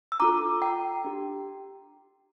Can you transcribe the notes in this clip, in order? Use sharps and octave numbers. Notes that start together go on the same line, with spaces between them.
E6
D4 F4 A4 A#5 D6
G5 A#5
D4 G4